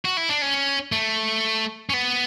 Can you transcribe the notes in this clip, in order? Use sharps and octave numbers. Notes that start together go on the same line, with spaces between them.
F#4
E4
D4
C#4
A3
C#4
B3